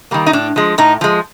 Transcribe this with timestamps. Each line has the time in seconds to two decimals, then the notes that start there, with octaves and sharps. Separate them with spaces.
0.11 D#3 G3 A#3
0.26 D#4
0.33 A2 D4
0.56 F3 G#3
0.78 A2 D#4
1.01 F3 G#3